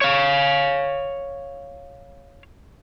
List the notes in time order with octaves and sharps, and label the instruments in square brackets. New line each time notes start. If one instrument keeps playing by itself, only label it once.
[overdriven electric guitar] C#5 F5